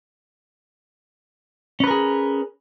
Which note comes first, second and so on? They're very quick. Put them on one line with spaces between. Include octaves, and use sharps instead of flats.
C#4 B4 A#4 G#4